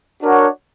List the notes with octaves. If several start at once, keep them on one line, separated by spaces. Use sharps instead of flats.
D4 F#4 A#4 C#5 F#5